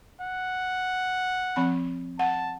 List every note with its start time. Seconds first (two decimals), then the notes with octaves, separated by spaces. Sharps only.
0.21 F#5
1.56 F3 C4 B5
2.19 F#5 A5